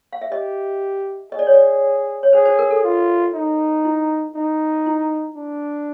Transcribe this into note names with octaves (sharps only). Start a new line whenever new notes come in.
F5
E5
G4 D#5
G#4 D#5
D5
C#5
D5
C#5
G#4 C5
C5
A#4
A4
F4
D#4
E4
D#4
E4
D4